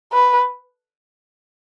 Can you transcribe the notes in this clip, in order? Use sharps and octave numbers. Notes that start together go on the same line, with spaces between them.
B4